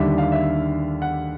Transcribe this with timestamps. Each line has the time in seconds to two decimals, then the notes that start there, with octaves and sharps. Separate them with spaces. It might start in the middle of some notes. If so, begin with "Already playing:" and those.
Already playing: D#2 D3 G3 E5
0.18 F5
0.32 E5
1.02 F#5